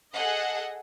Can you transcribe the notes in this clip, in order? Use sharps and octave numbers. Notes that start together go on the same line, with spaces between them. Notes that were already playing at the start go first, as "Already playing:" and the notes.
G#4 A4 D#5 F#5